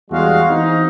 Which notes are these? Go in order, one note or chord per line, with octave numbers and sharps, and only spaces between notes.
E2 G3 G#3 F#4 F5
E3 C4 D#4